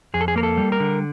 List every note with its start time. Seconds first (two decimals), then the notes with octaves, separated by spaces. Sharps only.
0.14 F2 G#4
0.21 A4
0.28 G#4
0.36 A#3 A#4
0.43 A4
0.57 G3
0.72 A#4
0.80 D3